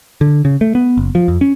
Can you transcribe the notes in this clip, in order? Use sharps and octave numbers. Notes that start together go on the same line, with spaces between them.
D3
C#3
A3
B3
F#1
F3
F2
C#4